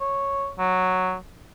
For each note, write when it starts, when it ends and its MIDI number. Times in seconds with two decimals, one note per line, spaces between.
0.01 0.49 73
0.59 1.16 54